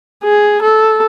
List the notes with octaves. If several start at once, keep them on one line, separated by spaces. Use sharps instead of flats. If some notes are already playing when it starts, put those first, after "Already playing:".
G#4
A4